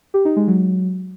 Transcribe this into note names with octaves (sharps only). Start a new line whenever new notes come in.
G4
D#4
G#3
F#3